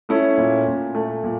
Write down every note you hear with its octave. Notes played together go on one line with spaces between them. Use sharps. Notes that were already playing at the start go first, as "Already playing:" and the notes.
A3 C#4 E4
A#2
A#2
A3
A#2